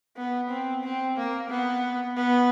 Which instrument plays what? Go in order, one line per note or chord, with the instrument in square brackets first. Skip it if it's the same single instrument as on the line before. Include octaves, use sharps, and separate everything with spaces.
[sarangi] B3
C4
C4
A#3
B3
B3